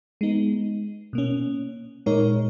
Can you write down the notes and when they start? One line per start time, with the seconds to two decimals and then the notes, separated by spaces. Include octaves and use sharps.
0.21 G#3 B3 D#4
1.13 B2 A#3 C#4
2.06 A#2 G#3 D#4 A#4 C#5